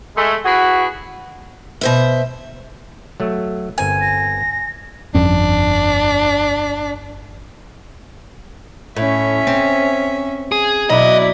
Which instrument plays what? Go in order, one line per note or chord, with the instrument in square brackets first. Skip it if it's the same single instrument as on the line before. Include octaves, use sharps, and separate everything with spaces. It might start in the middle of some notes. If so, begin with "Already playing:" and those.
[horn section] G#3 A3
E4 F#4 G#4 B4
[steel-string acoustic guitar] B2 C5 E5
[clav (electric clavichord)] F#3 A3
[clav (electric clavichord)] G1 C4 A#4 [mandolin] G#5
[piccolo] A#6
[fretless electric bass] G1 F2 C#4 [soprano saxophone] D4
[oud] A2 [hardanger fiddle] C#4 E5
[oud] C4
[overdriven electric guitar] G#4
[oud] B2 F#3 [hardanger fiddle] E4 D5 [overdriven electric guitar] D#5